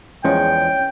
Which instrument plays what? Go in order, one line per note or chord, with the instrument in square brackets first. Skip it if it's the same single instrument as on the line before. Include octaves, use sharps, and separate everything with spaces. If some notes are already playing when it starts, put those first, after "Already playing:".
[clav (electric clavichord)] E2 F3 G#3 [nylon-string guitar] C#4 [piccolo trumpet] G5